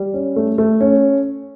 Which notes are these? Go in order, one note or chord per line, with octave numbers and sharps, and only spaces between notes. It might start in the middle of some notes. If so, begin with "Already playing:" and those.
Already playing: G3
C#4
A3
A3
C#4